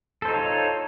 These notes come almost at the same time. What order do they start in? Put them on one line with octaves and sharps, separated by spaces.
A4 C5 D#4 F4 C#5